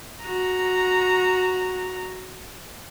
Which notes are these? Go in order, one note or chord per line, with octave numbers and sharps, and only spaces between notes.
F#4 A#5